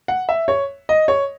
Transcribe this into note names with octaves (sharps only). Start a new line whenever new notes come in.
F#5
E5
C#5
D#5
C#5